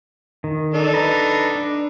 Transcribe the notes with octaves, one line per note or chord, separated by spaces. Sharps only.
D#3
D4 D#4 A4
B4 A#5
D4